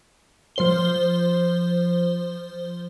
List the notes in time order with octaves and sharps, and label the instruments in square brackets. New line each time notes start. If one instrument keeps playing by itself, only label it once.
[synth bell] F3 C5 G7